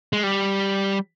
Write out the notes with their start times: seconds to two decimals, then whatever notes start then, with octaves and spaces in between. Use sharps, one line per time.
0.13 G#3
0.23 G3